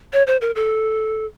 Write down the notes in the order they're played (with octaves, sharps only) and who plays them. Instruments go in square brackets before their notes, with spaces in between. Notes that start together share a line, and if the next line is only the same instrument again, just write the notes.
[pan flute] C#5
C5
A#4
A4